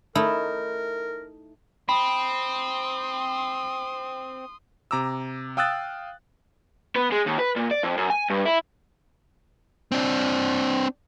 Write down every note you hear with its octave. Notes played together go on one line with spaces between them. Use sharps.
A3 D#4 E4 A#4
C4 B5 C6 D#6
C3 A#5 D6 E6
F5 G5 D#6 E6 F#6 A6
B3
G#3
D#2
B4
A#2
D5
F2
F#2
G#5
G2
E4
C4 D4